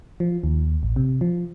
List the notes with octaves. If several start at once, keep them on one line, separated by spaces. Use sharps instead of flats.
F3
D#2
A1
C3
F3